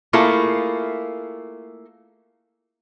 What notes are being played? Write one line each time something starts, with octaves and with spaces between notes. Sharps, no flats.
A3 A#3 E4 F4 G#4